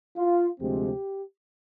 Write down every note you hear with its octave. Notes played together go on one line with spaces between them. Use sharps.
F4
D2 C3 F3 G#3 C4 G4